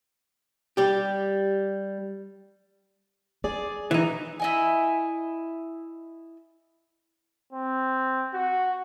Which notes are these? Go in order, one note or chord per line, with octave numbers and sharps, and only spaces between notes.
G3 G4
G#4 D5
E3 D#4
E4 D#5 G#5
C4
F#4